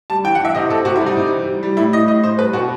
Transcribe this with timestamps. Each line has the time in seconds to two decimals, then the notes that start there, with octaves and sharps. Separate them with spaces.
0.10 G3 A5
0.24 E3 G5
0.35 F#5
0.40 E3 E5
0.55 C3 D#5
0.70 C3 A4
0.85 C3 F#4
0.96 E4
1.01 G3
1.06 D#4
1.17 C3
1.32 E3
1.47 G3
1.63 G3
1.77 A2 E4
1.93 A2 D#5
2.08 A2 D#5
2.23 A2 C5
2.39 G3 B4
2.53 B2 F#4